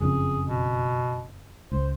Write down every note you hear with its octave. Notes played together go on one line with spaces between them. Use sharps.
F#1 F2 C#3 G#4
B2
C#2 C5